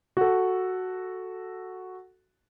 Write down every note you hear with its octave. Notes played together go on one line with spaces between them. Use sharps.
F#4 A4